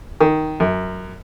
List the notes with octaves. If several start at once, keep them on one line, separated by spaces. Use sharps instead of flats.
D#3
F#2